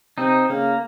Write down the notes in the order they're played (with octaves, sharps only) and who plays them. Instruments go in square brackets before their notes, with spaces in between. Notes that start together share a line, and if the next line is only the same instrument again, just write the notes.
[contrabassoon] C3 [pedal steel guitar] C4 D#4
[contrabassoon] C#3 [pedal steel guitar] A#3